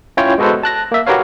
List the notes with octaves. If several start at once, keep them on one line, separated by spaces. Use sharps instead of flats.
C#4 E4 F4 C#5 G5
G#3 B3 F#4 A4 B4 C5
A5 F#6 A#6
A#3 E5
F#4 G4 A#4 B4 C#5 F5